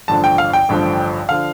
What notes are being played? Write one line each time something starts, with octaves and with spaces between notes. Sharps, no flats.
A1 G2 D3 F3 A5
G5
F5
G5
A1 G2 D3 F3
D3 F3 F5